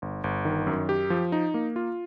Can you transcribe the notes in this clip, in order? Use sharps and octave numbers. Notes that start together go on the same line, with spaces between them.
G1
G1
D#3
F#2
G4
F3
D#4
A#3
F4